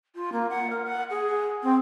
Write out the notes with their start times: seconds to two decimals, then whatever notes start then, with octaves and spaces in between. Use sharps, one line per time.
0.15 F4
0.32 A#3
0.49 F#5
0.70 A#4
0.85 F#5
1.10 G#4
1.62 C4